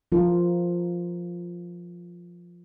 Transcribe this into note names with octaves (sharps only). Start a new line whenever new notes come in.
F3 F4 A#4